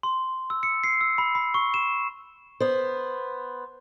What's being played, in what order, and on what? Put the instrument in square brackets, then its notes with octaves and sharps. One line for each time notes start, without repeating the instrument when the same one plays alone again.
[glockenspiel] C6
E6
C#7
C7
E6
B5
B5
C#6
E7
[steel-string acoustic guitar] B3 C5